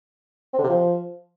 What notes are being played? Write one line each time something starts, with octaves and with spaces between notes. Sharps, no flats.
C4
D3
C3
F3